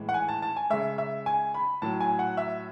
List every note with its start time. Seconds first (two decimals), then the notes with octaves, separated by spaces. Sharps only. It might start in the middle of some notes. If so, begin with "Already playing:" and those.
Already playing: A2 E3 G#3
0.09 F#5
0.14 G#5
0.28 A5
0.42 A5
0.57 G#5
0.70 C#3 G#3 E5
0.98 E5
1.26 G#5
1.54 B5
1.82 A2 F#3 A5
2.00 G#5
2.19 F#5
2.37 E5